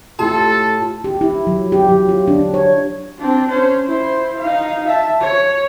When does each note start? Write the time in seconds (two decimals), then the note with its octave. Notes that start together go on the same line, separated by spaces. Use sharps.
0.19 A2 E4 F4 G4 A4 A5
1.04 G4
1.21 E4
1.47 F#3
1.72 G4
1.88 F#3
2.09 F4
2.28 D4
2.54 C#5
3.19 C4 D4
3.48 C#4 C5
3.86 E4 C5
4.40 D#4 F5
4.87 E5 A5
5.21 C#5